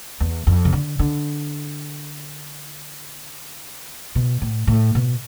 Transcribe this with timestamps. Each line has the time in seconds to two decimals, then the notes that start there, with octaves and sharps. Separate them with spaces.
0.21 E2
0.47 F2
0.65 C3
0.73 D3
0.99 D3
4.15 B2
4.42 A2
4.67 A2
4.95 B2